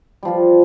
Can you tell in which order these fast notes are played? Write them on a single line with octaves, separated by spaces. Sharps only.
G3 F3 F4